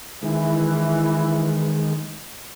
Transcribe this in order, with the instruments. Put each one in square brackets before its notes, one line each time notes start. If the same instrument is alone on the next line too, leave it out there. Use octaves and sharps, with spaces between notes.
[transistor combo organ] D#3 G#3 [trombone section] E3